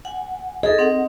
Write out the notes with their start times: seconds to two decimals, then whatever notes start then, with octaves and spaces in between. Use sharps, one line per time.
0.05 F#5 G#5
0.63 G#4 A4 D#5
0.79 C4 F#5